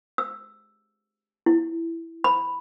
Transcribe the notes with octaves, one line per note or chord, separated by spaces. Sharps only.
E6
E4
B5